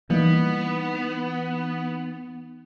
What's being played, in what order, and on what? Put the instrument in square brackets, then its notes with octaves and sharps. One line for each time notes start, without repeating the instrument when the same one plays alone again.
[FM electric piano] E3 D#4 [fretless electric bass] G3 A#3 [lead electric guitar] B3